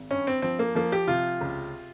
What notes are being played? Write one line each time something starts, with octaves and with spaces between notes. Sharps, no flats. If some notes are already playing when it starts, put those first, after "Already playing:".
Already playing: G#1
G2 C#4
C4
F3 C4
A#3
F3 A#3
G4
C3 F4
C#2